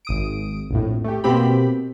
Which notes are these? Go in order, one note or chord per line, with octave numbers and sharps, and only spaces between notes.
G#1 D#6 D7
A#1 F2 A2
A3 G4
B2 A#3 C4 G4 B5